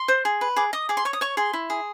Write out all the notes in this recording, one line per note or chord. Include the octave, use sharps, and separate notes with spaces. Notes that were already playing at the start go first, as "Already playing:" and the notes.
Already playing: C6
C5
G#4
B4
G#4 D6
D#5 D#6
G#4 D6
C6
C#5 C#6
D#6
C#5 C#6
G#4 C6
E4
G#4